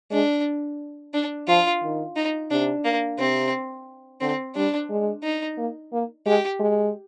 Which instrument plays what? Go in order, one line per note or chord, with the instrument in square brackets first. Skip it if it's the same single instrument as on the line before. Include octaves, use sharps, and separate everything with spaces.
[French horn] G#3 [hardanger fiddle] D4
[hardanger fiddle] D4
[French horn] F3 [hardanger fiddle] F4
[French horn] D#3
[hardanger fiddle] D#4
[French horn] C3 [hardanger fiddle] D4
[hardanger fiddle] A#3
[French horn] C3 [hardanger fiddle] C4
[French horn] D3 [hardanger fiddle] C4
[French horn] G3 [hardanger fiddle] D4
[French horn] G#3
[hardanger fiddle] D#4
[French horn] A#3
A#3
[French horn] G#3 [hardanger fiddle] G4
[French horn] G#3